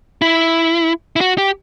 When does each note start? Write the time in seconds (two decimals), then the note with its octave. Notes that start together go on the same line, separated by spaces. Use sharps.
0.22 E4
1.16 E4
1.21 F#4
1.38 G4